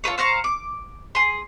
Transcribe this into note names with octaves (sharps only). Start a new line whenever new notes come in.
F4 A4 B4 C#5
C5 F5 A#5 C#6
D6
G#4 C6